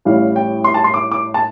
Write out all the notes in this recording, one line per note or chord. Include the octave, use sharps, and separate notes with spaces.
A1 A2 G3 F5
G5
C6
A5
C6
D6
D6
A5